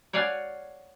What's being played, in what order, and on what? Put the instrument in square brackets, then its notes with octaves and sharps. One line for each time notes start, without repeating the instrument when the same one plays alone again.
[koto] C#5 D5 F5 F#5 G#5